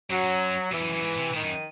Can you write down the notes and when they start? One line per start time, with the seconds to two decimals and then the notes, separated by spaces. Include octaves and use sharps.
0.10 F#2 F#3
0.72 E2 E3
0.82 F#2
0.93 F#2
1.03 G#2
1.18 C3
1.34 A2 D#3
1.43 F#2